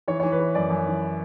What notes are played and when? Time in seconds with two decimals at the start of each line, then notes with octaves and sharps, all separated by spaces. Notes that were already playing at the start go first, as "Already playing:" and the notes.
0.08 E3 C#5
0.20 C#5
0.23 E3
0.32 B4
0.40 E3
0.55 F#2 D5
0.70 F#2
0.87 E3